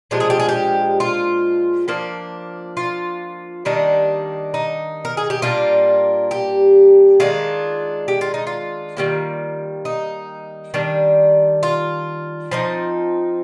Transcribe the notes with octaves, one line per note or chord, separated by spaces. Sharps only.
A#2 F3 G#3 D4 G4
G#4
G4
G#4
G4
F4
F3 A#3 D4
F4
D#3 G3 A#3 D4 D#4
D#4
A#4
G#4
G4
A#2 G3 A#3 D4 F4
G4
D#3 G#3 D4 F4
G4
F4
D#4
F4
D#3 G3 A#3
D#4
D#3 G3 D4
F4
F3 C4 D#4